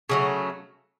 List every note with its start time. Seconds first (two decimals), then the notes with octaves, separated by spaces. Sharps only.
0.09 C#3 F#3 A3